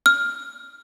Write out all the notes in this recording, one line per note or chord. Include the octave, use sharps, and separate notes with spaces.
F6